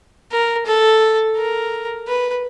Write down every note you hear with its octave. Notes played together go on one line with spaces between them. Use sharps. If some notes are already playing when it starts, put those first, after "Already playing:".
A#4
A4
A#4
B4